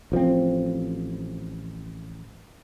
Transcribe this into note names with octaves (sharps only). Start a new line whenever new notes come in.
A1 F3 A3 C4